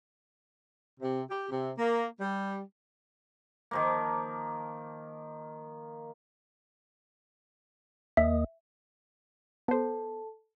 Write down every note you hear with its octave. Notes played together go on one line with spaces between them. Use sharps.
C3
G4
C3
A#3
G3
D#3 F3 A#3
D#2 A#3 D#5 E5
B3 A4 C5 A5